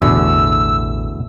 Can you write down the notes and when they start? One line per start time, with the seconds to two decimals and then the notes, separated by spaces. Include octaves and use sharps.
0.02 A1 E2 B2 D3 E6